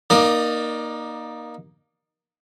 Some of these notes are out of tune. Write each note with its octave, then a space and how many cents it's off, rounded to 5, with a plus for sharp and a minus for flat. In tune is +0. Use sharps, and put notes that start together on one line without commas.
A#3 +15 D#4 -10 D5 +15